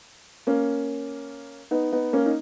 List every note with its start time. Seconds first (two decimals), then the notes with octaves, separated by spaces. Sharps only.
0.47 A#3 C#4
1.71 B3 D#4
1.92 B3 D#4
2.13 A#3 C#4
2.26 D#4